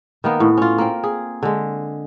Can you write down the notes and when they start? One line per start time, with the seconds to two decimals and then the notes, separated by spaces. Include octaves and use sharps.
0.24 D#3 A#3 B3
0.40 A2
0.57 C#4 F4
0.78 A#3 C4
1.03 G#4
1.43 D3 G#3